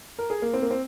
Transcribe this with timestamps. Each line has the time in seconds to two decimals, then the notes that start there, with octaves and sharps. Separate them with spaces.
0.19 A#4
0.30 G#4
0.42 A#3
0.53 C4
0.62 A#3
0.71 C4